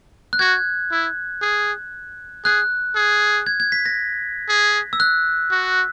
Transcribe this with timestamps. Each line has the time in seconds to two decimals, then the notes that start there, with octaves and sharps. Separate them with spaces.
0.33 F#6
0.39 F#4 G#6
0.91 E4
1.42 G#4
2.45 G#4 F#6
2.96 G#4
3.46 G#6
3.60 G#6
3.72 B6
3.86 A#6
4.49 G#4
4.93 E6
5.00 F#6
5.51 F#4